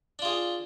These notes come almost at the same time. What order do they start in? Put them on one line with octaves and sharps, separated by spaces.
D4 F4 G#4